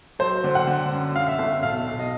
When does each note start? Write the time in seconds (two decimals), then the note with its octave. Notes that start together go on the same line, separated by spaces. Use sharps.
0.19 F#3 C5
0.44 D3
0.55 F#5
0.67 D3
0.92 F#2
1.16 D3 F5
1.28 E5
1.39 G1
1.63 B1 F5
1.87 B1
1.99 D#5